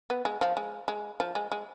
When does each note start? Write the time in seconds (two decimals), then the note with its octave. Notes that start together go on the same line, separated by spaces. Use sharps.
0.10 B3
0.25 G#3
0.41 F3
0.57 G#3
0.88 G#3
1.20 F3
1.35 G#3
1.52 G#3